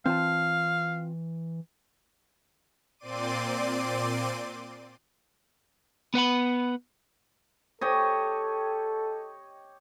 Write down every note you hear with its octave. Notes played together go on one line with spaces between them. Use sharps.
E3 C4 F4 F5 A5
A#2 C4 D5 C6 D6 D#7
B3 B4 F#5 B5
G4 A4 C#5 D#5